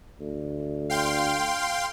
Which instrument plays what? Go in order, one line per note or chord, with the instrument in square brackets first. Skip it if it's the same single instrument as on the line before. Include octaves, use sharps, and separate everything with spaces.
[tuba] D2
[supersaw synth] F5 G5 C6